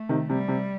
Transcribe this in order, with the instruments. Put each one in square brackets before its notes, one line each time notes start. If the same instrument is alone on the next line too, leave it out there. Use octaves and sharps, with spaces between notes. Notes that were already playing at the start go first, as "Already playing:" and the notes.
Already playing: [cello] A3
[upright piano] C3 D#3
[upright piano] C3 [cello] G3
[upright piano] C3